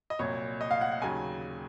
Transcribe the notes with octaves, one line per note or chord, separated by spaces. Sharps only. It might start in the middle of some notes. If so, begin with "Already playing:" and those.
D#5
C2 A#2 F#3 C#5
D#5
F5
F#5
F#5
D#2 C#3 F#3 G#5